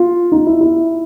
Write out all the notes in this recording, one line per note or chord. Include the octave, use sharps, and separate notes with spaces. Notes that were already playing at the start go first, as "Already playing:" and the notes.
Already playing: F4
D#4
E4
E4